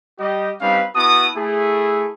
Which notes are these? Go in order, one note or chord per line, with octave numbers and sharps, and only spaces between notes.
G3 G4 D#5
G3 C4 C#4 D#4 B4 F5
B3 E4 F#4 A5 D#6
A3 E4 G#4